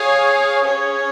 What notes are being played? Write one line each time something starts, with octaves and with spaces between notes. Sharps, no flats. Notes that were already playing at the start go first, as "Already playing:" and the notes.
Already playing: G#4 C#5 F5 G#5
C#4 G#4 C#5